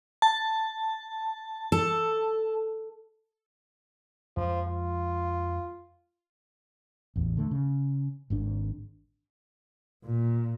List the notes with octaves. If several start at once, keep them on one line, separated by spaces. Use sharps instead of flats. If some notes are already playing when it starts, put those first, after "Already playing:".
A5
A4
F2 F3 G#3
F4
A1 E2
D3 A3
C#3
G#1 G#2 D4
A#2